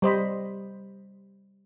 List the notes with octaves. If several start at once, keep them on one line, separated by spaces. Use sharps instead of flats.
G3 C5 D#5 B5